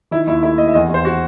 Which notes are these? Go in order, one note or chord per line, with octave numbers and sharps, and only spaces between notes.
D#3 E4
D#2 E4
A3 E4
A3 D#5
E5
E2 D#5
E2
C5
F#4